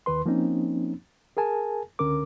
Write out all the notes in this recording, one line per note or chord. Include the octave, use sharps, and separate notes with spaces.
D#2 D#3 B4 C6
F3 A#3 C4 C#4 D#4
G#4 A#4 G#5 A5
C#2 D3 C#4 A#4 D6